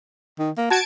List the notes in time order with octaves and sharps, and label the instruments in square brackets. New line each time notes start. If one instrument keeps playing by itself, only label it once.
[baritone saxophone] D#3
A#3
[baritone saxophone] F#4 [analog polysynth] A5 G#6 D7